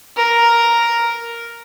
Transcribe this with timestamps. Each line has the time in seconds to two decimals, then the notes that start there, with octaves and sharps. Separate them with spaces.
0.17 A#4